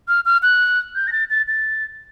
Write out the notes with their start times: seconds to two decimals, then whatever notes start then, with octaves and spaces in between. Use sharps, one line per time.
0.08 F6
0.25 F6
0.42 F#6
0.95 G6
1.07 A#6
1.12 A6
1.30 A6
1.48 A6